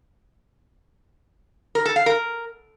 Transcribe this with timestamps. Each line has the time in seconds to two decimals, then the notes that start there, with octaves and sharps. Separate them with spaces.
1.75 A#4
1.85 A4
1.96 F5
2.06 A#4